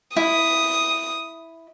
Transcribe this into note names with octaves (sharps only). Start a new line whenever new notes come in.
E4 D#6